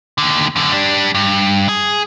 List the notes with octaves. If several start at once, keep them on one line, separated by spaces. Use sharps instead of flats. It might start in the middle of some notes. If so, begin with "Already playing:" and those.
D#2 D3
F#2 D3
G3 D4
G2
G#4